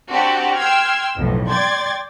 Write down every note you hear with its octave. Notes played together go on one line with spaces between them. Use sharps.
C4 D4 F#4 G4
G5 C6 E6 F6 G#6
B1 F2 A2
D5 G5 C6 G#6 A6